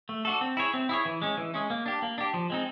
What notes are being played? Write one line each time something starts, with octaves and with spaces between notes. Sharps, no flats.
A3
D4 F#4 A4
C4
E4 G#4 C#5
C4
E4 G#4 C#5
E3
G#3 C#4
E3
G#3 C#4
A#3
D4 G4
A#3
D4 G4
F3
G#3 C4 D#4